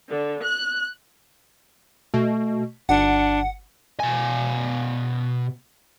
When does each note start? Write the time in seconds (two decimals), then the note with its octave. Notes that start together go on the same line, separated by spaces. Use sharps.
0.11 D3
0.43 F#6
2.14 B2 A3
2.89 G1 D4 F#5
4.00 B2 G#5